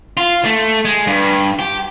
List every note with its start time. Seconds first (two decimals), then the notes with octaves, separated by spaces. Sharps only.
0.17 F4
0.45 A3
0.85 G#3
1.07 G2
1.59 G4